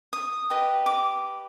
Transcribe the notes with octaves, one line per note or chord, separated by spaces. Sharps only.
D#6
G4 B4 D#5
D6